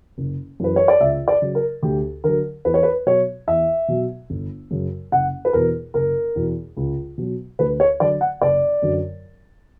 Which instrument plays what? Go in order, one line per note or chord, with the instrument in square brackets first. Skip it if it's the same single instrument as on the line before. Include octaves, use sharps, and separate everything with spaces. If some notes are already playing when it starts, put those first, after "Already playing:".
[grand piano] F#1
F#2 E3 B4
C#5
D5
C#2 E5
D5
C#3 F#3
A#4
D2 G4
D3 F#3 A#4
E2 B4
C#5
B4
B2 F#3 C#5
E2 E5
B2 F#3
G1
F#2 C#3
F#1 F#5
B4
E2 B2 A#4
F#1 A#4
E2 B2
C#2
B2 F#3
D2 B4
C#5
D3 F#3 D5
F#5
F#1 D5
F#2 D3 F#3